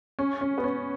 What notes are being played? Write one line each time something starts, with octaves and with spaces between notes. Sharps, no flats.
C#4
C#4
B3
C#4